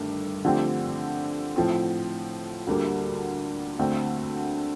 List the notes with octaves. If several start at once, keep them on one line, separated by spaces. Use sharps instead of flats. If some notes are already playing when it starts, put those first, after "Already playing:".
Already playing: G1 G2 D#3 A3
D3 F3 A3 C4 G4
A2 F3 C4
D2 D3 G3 A#3
D2 D3 A3 C4